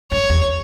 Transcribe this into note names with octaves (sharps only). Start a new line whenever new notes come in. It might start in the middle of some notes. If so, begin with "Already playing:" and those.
F#2 C#5
E2